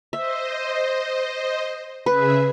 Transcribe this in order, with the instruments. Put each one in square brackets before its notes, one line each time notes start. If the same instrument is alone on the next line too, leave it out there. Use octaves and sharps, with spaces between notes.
[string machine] C5 D#5 [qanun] E5
[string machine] C#3 G#4 E5 [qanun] B4